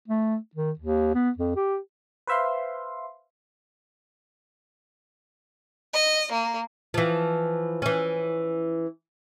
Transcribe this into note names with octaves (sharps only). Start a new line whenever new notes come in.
A3
D#3
D#2
B3
F2
G4
B4 C5 E5 F5 C6
D#5
A#3
E3 F3
E3 C#4